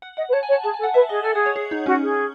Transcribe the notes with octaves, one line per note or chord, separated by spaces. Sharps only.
F#5
D#5 F#5
B4
C#5 A5
G#5
C#5
A5
G#4 A5
A4 G#5
F#5
B4 E5
G#4 D#5
A4 G#5
G#4 F#5
C#5
G#4
D#4
C#4 F#4
G#4